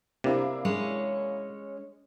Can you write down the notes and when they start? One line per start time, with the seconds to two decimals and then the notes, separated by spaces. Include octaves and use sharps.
0.24 C3 A#3 D4 E4
0.65 G#3 C#4 C#5